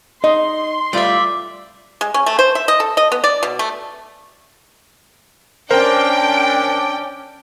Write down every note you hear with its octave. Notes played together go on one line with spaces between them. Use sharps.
D#4 D#5 C6
G3 A3 F4 D5 E5
G#3
C#4
A3
C5
E5
D#5
A4
D#5
B3
D5
B2
A3
C#4 D4 A#4 C5 D5 G5